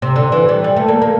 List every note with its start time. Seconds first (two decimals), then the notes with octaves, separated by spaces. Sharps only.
0.02 C3
0.16 D3
0.32 E3
0.49 G3
0.64 G3
0.77 A3
0.89 A#3
1.02 A#3